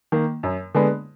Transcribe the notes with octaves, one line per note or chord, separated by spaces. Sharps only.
D#3 A#3
F#2
D3 G#3 B3